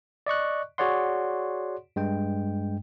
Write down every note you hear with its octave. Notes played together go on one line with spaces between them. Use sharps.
D5 D#5 C#6 F#6
F#4 G#4 C#5 D5 F#5 C6
G2 G#3 G5